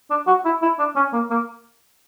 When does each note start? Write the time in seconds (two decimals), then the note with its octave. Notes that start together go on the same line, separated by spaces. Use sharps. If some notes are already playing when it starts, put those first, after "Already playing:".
0.10 D4
0.27 F#4
0.45 E4
0.62 E4
0.79 D4
0.96 C#4
1.13 A#3
1.30 A#3